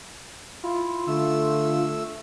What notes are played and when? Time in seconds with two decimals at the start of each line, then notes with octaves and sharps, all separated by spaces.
0.63 E4 F4
1.08 D3 A3 E6